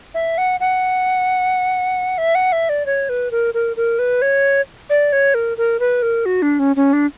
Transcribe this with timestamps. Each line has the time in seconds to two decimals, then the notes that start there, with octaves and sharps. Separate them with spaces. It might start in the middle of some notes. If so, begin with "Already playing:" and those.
0.14 E5
0.38 F#5
0.60 F#5
2.18 E5
2.35 F#5
2.52 E5
2.69 D5
2.86 C#5
3.09 B4
3.31 A#4
3.54 A#4
3.77 A#4
3.99 B4
4.22 C#5
4.90 D5
5.13 C#5
5.34 A#4
5.58 A#4
5.80 B4
6.02 A#4
6.26 F#4
6.42 D4
6.59 C#4
6.76 C#4
6.93 D4